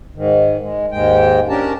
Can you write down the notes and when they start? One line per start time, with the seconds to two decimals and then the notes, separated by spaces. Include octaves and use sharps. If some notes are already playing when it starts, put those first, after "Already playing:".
0.16 G#2 D#3
0.62 G#3
0.91 D#2 G#2 G#3 G5
1.49 C#4 D4 G4 A#4 A5